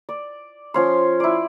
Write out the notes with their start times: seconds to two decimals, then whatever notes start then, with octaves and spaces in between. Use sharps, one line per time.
0.09 D5
0.74 F3 C#4 C6
1.20 E4 D5